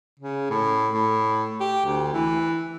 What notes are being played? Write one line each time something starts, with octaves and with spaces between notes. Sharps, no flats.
C#3
A2
A2
G4
D2
E3